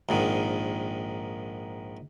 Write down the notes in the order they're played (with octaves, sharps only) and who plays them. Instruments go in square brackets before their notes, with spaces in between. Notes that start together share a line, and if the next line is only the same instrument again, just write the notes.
[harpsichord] A#1 G#2 D#3